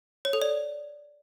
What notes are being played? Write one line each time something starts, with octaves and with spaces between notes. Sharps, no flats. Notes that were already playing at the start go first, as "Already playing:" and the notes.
C#5
A4
D5